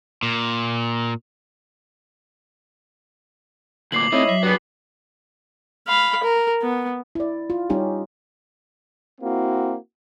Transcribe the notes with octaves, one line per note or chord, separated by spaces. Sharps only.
A#2
D2 A#2 D6 C7 F#7
A3 C4 D#4 E4 C#5 D#5
F#3 E5
G2 B3 F#4 G#4
F5 B5
A#4
B3
E4 D5
F4
G3 C#4 D#4 G4
A#3 C4 E4 F#4